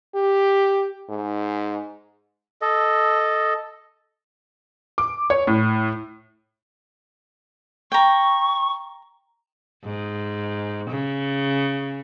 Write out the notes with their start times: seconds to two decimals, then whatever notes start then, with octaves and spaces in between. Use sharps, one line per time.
0.15 G4
1.10 G#2
2.62 A4 D#5
4.98 D6
5.30 C#5
5.47 A2
7.92 G5 A#5 C#6
9.85 G#2
10.90 C#3